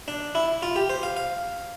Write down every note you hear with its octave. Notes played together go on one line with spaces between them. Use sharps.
D4
E4
F4
G4
C5
F5
F5